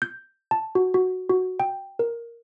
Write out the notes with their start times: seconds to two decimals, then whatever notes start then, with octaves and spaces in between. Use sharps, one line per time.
0.02 G6
0.51 A5
0.75 F#4
0.94 F#4
1.30 F#4
1.60 G5
1.99 A#4